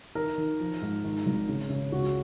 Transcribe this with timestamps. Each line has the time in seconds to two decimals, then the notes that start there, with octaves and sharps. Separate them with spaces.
0.15 D#3 A#4
0.38 D#3
0.60 F3
0.82 G#2
1.04 D#3
1.26 G#1
1.49 C#3
1.70 C#3
1.92 C#2 F#4